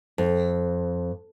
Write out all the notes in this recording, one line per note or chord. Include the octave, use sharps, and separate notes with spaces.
F2